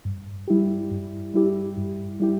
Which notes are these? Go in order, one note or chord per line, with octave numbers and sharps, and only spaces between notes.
G2
G3 E4 G4
G2
G3 E4 G4
G2
G3 E4 G4